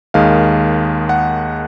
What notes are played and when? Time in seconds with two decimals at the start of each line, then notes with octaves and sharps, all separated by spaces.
0.14 D#2 D#3 G#3 F5
1.09 F#5